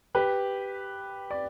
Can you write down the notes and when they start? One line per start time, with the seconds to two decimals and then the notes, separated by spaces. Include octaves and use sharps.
0.15 G4 B4
1.30 D5